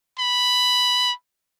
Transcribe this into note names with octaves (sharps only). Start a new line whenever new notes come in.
B5